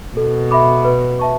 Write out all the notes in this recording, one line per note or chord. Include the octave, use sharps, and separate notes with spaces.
B2 A4
E5 B5 D6
B4
E5 A5 C#6